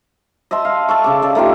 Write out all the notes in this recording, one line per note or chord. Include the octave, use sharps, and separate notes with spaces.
D#5 E5 A5 C6
F5
A4 A5 C#6
C#3 D6
A4 D5
A3 D#4 F4 G4